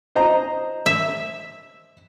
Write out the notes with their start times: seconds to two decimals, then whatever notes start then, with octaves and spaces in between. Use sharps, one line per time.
0.15 C5 D#5 A#5
0.86 E5